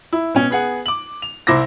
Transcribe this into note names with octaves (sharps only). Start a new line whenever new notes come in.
E4
B2 C#4
B3 G#4 F#5
D6 F#7
F7
C2 E4 C5 D6 A#6